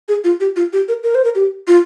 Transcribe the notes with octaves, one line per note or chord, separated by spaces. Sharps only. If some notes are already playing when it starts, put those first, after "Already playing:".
G#4
F4
G4
F4
G4
A#4
A#4
C5
A#4
G4
F4